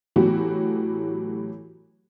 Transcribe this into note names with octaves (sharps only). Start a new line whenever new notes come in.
A2 E3 F#3 B3 F#4 G4